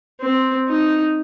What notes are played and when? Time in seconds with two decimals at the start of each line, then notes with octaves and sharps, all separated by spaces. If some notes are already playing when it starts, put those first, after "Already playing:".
0.21 C4
0.68 D#4